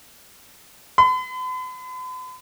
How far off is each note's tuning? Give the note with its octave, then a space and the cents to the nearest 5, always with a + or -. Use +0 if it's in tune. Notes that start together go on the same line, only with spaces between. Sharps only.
B5 +45